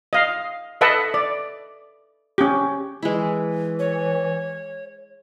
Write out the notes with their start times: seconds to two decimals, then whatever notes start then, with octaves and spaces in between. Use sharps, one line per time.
0.13 D#5 F5
0.81 A4 B4 D#5 E5 F#5 A5
1.14 D5
2.38 C#4 G4
3.03 E3 G#3 E4
3.79 C#5